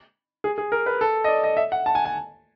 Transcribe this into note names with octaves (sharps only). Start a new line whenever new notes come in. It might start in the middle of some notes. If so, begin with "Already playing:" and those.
G#4
G#4
A#4
B4
A4
D#5
D5
D#5
E5
F#5
A5
G#5
G#5